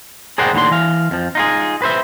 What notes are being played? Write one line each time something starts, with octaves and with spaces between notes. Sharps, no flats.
G#4 A#4 C5 D5 F#5 G5
D#2 A2 D3 C6
E3 F5
F2 F3
D#4 F4 G#4
B4 C5 E5